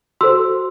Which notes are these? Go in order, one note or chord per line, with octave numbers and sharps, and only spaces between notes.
F#4 A4 C5 C6 E6